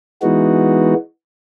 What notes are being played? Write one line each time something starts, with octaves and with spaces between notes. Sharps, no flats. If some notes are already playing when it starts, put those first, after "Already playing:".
E3 G#3 B3 D#4 F#4